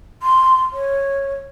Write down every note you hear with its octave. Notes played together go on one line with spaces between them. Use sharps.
C6
C#5